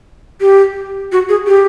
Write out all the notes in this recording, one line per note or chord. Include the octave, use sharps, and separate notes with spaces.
G4
F#4
G#4
G4